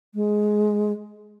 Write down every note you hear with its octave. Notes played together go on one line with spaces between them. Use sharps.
G#3